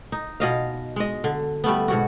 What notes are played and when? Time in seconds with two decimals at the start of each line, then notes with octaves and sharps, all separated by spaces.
0.12 D#4
0.40 B2 D#5 F5
0.96 G#3 D#5
1.24 D3
1.64 G3 A3 B3
1.88 G#2 B2 F#4